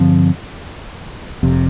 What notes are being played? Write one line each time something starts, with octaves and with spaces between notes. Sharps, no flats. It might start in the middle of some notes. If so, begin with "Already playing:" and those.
Already playing: G2 D3 F3 C4
F1 F2 C3